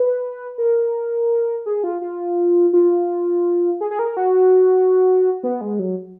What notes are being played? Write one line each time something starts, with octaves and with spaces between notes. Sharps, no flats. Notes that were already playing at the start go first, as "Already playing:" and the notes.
Already playing: B4
A#4
G#4
F4
F4
F4
G#4
G#4
A#4
F#4
B3
G#3
F#3